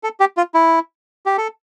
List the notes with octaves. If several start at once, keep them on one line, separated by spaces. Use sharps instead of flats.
A4
G4
F4
E4
G4
A4